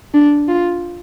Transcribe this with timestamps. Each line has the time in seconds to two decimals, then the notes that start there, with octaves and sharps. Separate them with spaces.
0.14 D4
0.48 F4